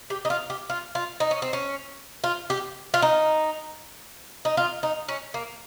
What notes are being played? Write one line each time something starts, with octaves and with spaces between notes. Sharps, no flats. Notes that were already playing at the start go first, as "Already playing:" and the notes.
G4
D#4
F4
G4
F4
F4
D#4
C#4
C4
C#4
F4
G4
F4
D#4
D#4
F4
D#4
C#4
A#3